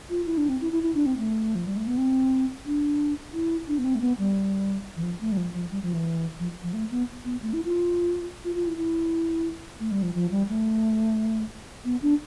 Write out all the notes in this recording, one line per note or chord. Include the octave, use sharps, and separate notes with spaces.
F4
E4
D4
C4
E4
E4
E4
D4
C4
A3
F3
G3
A3
B3
C4
D4
E4
D4
B3
C4
A3
B3
G3
E3
F3
A3
G3
F3
F3
G3
F3
E3
F3
F3
A3
B3
B3
A3
E4
F4
F4
F4
E4
E4
A3
G3
F3
F3
G3
A3
B3
D4